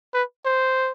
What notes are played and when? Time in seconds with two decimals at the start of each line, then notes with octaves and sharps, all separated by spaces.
0.13 B4
0.45 C5